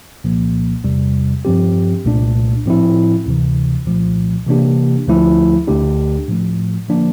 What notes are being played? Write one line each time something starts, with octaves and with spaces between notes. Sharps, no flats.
C2 A#2 F3 A#3
E2 C3 G3
G2 F3 C4 G4
C2 A#2 A3 D4
A2 F3 C4 E4
D2 C3 E3
C2 A#2 F3 A3
C3 E3 A#3 D4 G4
D2 D3 F3 A3 E4
D2 D3 A3 D4 G4
A2 F3 A3
D3 F3 A#3 D4